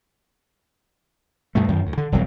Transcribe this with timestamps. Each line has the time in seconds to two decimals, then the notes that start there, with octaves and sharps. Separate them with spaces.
1.55 G2 B2 A3
1.68 F#2 D#3
1.86 D2
1.98 D3
2.12 E1 C2 F#3